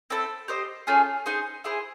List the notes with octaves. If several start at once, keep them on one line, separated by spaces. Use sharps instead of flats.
C4 E4 A4
G4 C5 D#5
A3 C#4 F4 G#4
D#4 G#4 C5
E4 G#4 C5